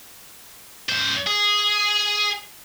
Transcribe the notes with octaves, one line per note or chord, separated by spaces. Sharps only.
C#2 C5
G#4